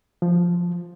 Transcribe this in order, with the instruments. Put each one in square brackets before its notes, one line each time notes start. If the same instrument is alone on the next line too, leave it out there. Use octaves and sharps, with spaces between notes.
[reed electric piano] F3